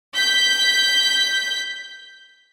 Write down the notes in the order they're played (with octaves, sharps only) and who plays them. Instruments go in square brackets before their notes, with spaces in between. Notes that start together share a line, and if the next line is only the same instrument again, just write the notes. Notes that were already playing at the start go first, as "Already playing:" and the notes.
[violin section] G6 B6